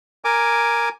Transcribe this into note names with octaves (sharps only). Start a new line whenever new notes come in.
A#4 G#5 D6